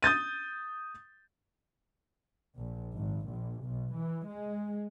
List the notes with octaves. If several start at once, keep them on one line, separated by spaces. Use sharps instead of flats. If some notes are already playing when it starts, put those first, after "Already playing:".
D#6 G6 A6 D#7
A#1
G#1
A#1
B1
E3
G#3